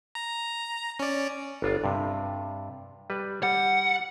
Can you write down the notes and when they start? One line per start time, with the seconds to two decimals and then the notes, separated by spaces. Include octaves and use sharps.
0.15 A#5
0.99 C#4 D5
1.62 G1 D4 F4
1.84 G2 C3
3.10 G3 B4
3.43 G3 F#5